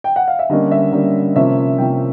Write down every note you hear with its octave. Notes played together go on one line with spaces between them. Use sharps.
G5
F#5
F5
E5
D3 G3 A#3 C#4 D#5
E5
D3 G3 A#3 C#4
C3 F3 A#3 C#4 E5
C3 F3 A#3 C#4 G5